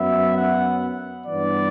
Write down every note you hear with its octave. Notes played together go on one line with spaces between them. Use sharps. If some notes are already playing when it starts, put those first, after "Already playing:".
Already playing: F#2 F#3 B3 E5
F#5
G2 E3 B3 D5